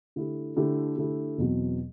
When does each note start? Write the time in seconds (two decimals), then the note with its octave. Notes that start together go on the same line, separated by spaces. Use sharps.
0.16 D3 A3 E4 G4
0.56 D3 A3 E4 G4
0.98 D3 A3 E4 G4
1.38 E2 B2 F#3 C4 F#4